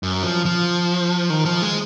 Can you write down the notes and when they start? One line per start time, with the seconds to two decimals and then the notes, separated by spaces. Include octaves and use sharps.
0.03 F#2
0.23 F3
0.45 F3
1.30 D#3
1.45 F3
1.62 G#3